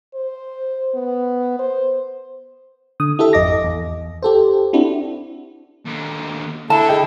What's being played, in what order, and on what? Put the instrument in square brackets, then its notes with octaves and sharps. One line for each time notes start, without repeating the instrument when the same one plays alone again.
[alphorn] C5
B3
C5
[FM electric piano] D3 D#6
E4 G4 A4 E5
G#1 F2 D#5 D6 A#6
E2
G4 A4 C5
C4 D4 E4 F#4 G4
[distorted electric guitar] D#2 D3
[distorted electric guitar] D3 [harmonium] E4 A4 [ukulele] A5
[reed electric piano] G#4 D#5 G5